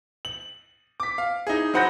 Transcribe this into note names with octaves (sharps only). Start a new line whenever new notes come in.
F#7
D6 B6
F5
D#4 E4 G#4
F#3 C5 F#5 B5 G6 A#6